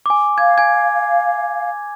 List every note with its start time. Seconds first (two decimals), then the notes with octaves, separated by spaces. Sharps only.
0.06 G#5 D6
0.38 F5 G#6
0.58 G#5 G#6